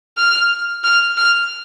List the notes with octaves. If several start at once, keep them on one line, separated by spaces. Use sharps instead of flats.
F6
F6
F6